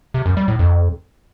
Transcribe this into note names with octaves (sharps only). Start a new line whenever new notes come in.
C3
F#2
G3
A2
F2